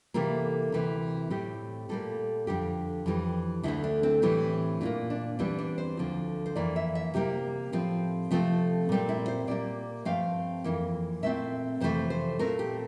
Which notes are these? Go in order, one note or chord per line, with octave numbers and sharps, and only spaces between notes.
C3 E3 G3 A#3 A4
D2 C3 E3
A2 G3 C4 G4
A#2 G3 A#3 A4
F2 D3 G3 G4
F2 E3 G3
D2 D3 A3 E4
D4
C4
A2 E3 G3 C4
A#2 G3 A#3 D4
D4
E2 E3 G3 C4 D4
D4
C5
D2 D3 F3
C5
F2 E3 A#3 D5
E5
E5
C3 G3 A#3 G4
A2 F3 C4
C3 F3 A3 C4
A#2 G3 C4
E4
C5
A#2 G3 A#3 D5
G2 F3 A3 C4 F5
F2 E3 A#3
A#2 A3 C4 E5
F2 C3 E3 A3 C5
C5
A#2 A3 C4 A#4
G4